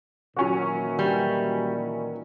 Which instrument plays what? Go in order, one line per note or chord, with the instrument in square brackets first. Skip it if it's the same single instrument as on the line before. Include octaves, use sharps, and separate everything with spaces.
[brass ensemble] A#2 D#3 E3 [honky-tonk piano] F#3 C#4 F#4
[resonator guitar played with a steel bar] G3